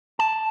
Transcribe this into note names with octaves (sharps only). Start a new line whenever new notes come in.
A5